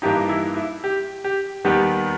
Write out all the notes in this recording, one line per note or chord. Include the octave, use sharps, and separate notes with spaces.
G2 E3 A#3 D#4 G4
E4
E4
G4
G4
D#2 D#3 G3 B3 D#4 G4